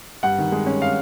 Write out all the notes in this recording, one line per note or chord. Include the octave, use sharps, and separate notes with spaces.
G2 F#5
D#3
G#3
C#4
F5